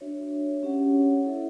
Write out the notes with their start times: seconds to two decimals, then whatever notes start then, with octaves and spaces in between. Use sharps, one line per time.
0.01 D4 F#4 C#5 E5
0.63 C#4 G4 C#5 F#5
1.25 E4 A4 E5